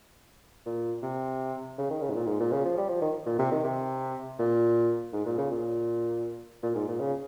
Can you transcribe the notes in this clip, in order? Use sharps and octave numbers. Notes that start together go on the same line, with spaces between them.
A#2
C3
C#3
D#3
C#3
G#2
A#2
G#2
A#2
C#3
F3
G3
F3
D#3
A#2
C3
D#3
C3
A#2
G#2
A#2
C#3
A#2
A#2
G#2
A#2
C#3